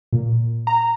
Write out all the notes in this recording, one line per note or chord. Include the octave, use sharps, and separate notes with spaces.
A#2
A#5